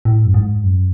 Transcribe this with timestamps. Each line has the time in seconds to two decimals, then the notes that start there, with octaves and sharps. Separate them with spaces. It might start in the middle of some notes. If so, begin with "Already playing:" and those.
0.05 A2
0.26 F#2
0.34 G#2
0.64 F#2